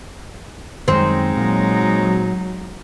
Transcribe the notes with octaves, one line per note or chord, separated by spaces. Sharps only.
F#2 D#3 G#3 C4 D#4
A#2 F#3